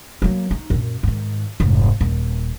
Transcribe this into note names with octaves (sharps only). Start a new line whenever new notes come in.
F#3 A#3
D#4
F#2 A#2
G#2 D#3
F1 G#2
D#1